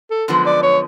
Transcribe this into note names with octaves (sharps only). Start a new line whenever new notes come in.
A4
F#2 D3 F3 G#3 B3
D5
C#5